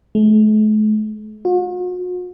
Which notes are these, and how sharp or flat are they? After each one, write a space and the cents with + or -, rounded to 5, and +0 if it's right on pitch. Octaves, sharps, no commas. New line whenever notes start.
A3 -45
F#4 -45